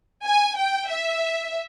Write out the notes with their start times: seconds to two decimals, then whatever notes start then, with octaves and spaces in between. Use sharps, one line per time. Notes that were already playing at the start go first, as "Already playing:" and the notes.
0.24 G#5
0.56 G5
0.88 E5